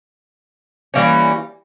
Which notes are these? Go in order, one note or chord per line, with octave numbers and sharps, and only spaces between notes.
E3 G3 A#3 C#4